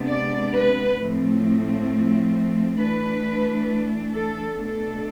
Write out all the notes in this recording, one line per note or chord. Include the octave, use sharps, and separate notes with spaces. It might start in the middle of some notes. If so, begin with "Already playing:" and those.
Already playing: C3 G#3 B3 D4
D5
B4
A2 F3 A3 C4
E3 A3 D4 B4
A4
B2 A3 D4 A4